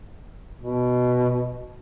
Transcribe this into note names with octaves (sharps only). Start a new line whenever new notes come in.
B2